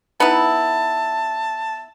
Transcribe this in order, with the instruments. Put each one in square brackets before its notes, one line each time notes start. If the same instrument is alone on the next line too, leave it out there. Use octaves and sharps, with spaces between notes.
[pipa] B3 D#4 E4 [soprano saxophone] A5